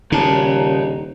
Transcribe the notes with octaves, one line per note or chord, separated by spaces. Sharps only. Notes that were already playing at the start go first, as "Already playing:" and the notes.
D#1 C#3 D#4 A5